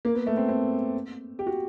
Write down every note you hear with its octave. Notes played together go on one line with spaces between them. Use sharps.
A#3
B3
A3
C4
C4
G4
F#4